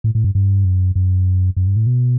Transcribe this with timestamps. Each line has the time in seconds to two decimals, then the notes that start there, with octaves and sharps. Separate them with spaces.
0.04 A2
0.15 A2
0.24 G2
0.35 G2
0.65 F#2
0.95 F#2
1.57 F#2
1.67 G2
1.76 A2
1.86 B2